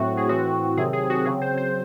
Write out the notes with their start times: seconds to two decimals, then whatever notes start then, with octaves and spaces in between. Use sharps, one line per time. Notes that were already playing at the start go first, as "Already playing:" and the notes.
Already playing: A2 F#3 A3 C4 F#4
0.17 G#4
0.29 A2 E3 C4 F#4
0.77 C3 D#3 F#3 C4 G#4
0.93 G#4
1.10 F#4
1.25 C#3 F#3 C4 G#4
1.41 C5
1.58 C5